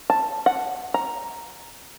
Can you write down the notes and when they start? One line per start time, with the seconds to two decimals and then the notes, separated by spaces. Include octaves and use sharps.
0.10 A5
0.46 F#5
0.94 A#5